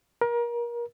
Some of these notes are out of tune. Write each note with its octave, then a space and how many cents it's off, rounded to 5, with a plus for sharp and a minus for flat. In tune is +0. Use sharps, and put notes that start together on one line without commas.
A#4 +30